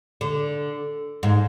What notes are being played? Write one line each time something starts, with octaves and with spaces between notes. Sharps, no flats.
D3
G#2